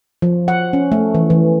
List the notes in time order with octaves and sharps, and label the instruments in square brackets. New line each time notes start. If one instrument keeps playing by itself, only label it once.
[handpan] F3
F#5
C#4
A3
E3
E3